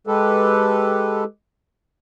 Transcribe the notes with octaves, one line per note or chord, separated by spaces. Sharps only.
G#3 G4 A4 B4